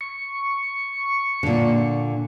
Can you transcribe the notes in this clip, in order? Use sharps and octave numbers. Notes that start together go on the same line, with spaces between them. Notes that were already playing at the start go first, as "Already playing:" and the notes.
C#6
A#2 D3